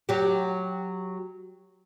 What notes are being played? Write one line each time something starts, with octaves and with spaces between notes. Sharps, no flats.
F#3 G4